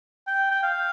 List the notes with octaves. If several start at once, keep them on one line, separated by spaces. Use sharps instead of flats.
G5
G5
F5